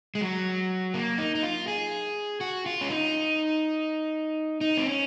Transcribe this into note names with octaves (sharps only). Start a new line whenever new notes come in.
G#3
F#3
A#3
D#4
D#4
F4
G#4
F#4
F4
C#4
D#4
D#4
C4
C#4